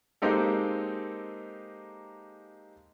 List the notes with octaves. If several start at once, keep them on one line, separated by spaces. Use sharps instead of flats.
G#3 A#3 C4 D#4 G4 A4